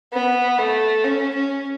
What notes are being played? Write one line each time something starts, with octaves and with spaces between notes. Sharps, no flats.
B3
A3
C#4
C#4